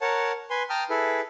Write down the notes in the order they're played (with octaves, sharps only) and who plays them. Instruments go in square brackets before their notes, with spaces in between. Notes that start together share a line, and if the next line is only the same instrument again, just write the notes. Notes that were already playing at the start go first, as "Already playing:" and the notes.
[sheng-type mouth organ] A#4 C#5 F#5 A5
B4 G#5 C6
G5 A5 A#5 D#6 F6
E4 G#4 A4 B4